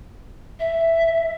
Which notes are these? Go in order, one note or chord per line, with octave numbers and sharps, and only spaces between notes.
E5